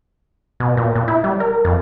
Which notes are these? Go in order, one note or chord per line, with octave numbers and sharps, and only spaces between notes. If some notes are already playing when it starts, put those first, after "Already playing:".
B2
A#2
A#2
E4
G3
A#4
F2